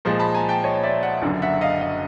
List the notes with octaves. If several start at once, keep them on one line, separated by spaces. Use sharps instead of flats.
A#2 F3 G#3
A5 B5
G#5 A#5
G5 A5
C#5 D#5
D5 E5
E5 F#5
F#1 F#2 D3
E5 F#5
D#5 F5
D#5 F5